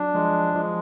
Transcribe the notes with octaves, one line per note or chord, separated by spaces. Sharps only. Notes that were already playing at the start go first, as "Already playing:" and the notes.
Already playing: F#3 D4
F3 G#3
F3 G#3